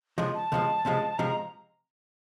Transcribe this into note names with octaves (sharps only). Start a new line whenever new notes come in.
C#2 C3 F3 G#3
A5
C#2 C3 F3 G#3
C#2 C3 F3 G#3
C3 F3 G#3 A#5